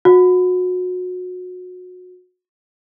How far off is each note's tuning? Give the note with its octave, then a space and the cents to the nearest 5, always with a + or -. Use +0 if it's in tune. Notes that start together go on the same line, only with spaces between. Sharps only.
F#4 -30